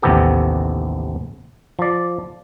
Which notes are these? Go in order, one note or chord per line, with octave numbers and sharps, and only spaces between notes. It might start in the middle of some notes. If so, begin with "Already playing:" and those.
A1 D#2 C3 B3 G4 A4
F3 D5